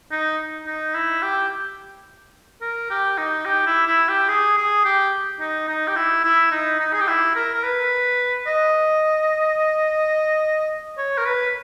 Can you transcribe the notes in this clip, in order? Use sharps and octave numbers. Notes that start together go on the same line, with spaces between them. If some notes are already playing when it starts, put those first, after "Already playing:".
D#4
D#4
E4
G4
A#4
G4
D#4
G4
E4
E4
G4
G#4
G#4
G4
D#4
D#4
G4
E4
E4
D#4
D#4
G#4
G4
E4
A#4
A#4
B4
D#5
C#5
A#4
B4